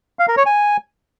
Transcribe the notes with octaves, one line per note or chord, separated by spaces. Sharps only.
F5
A#4
C#5
G#5